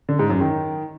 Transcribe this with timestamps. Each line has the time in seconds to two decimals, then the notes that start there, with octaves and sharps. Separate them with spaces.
0.09 D3
0.19 G#2
0.30 F#2
0.41 D#3